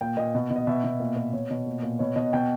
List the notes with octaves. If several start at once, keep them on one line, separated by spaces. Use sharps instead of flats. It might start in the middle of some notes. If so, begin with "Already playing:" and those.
A#2 G5
A#2 D#5
B2
B2
D#5
B2 E5
B2
A#2
A#2
B2 C#5
B2
A#2
A#2
B2 C#5
B2 D#5
B2 G5